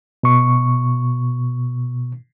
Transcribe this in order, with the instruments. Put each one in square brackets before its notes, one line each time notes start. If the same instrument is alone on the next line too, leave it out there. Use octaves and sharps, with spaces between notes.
[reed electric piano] B2 C#6